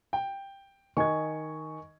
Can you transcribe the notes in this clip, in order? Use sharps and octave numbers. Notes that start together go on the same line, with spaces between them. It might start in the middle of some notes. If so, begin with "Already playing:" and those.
G5
D#3 D#5 G#5 C#6 G#6